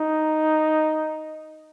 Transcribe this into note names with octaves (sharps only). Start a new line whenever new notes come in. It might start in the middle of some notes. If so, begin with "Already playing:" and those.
Already playing: D#4